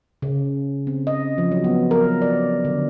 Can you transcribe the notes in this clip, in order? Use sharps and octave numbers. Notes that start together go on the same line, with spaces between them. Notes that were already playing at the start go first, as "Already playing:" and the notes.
C#3
C4
D#5
F3
F#3
B3
A#4
D5
D3